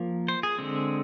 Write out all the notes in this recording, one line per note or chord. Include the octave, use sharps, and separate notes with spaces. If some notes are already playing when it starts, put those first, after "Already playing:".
Already playing: F3 A#3
C5
G#4
D3 G#3 C4